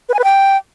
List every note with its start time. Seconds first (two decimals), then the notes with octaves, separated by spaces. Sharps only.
0.09 B4
0.14 G#5
0.19 B4
0.24 G5